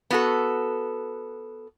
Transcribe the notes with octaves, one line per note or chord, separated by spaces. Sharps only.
B3 F#4 A4